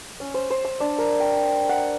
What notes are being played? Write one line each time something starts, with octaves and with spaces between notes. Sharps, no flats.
C#4
C5
C5
E6
D4
A#4
G5
F#5